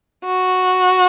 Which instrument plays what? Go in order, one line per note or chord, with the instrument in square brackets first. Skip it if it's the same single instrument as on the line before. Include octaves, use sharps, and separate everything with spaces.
[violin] F#4